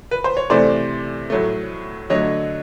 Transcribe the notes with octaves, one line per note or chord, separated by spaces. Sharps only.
B4
C5
C#5
C3 E3 A3 C5 D5
A2 F#3 A3
D3 F#3 A3 C#5 D#5